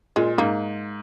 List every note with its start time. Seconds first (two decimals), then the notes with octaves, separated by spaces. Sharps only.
0.16 A#2 G#3
0.38 G#2 A#3